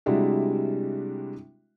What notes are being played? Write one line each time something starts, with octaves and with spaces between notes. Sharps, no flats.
C3 G3 G#3 D4 E4 F#4